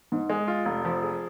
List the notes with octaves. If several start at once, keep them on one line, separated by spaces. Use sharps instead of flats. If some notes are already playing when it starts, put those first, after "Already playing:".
G#2
G#3
F4
F1
F3
G#4